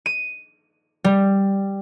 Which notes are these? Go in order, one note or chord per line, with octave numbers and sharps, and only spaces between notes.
D#7
G3